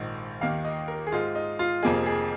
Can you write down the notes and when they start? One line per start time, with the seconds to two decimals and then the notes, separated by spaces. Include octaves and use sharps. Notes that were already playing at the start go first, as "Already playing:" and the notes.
Already playing: A#1 G#2 D#3
0.41 D#2 D#3 A#3 D#4 F5
0.65 D#5
0.88 A#4
1.07 G#4
1.12 G#2 G#3 D#4 F4
1.35 D#4
1.59 F4
1.82 F1 F2 F3 A#3 D#4 G#4
2.06 G#4